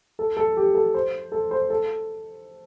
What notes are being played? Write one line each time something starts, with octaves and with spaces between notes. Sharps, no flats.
A4
A4
G4
A4
C5
A4
C5
A4